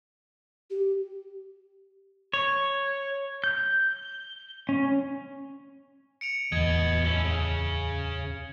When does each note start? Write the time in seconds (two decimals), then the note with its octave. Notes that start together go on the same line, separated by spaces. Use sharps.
0.70 G4
2.33 C#5
3.44 G6
4.69 C#4
6.21 C#7 D7 F7
6.52 D1 E2 B3 D#5 G#6
7.04 C#4 E4
7.24 C#3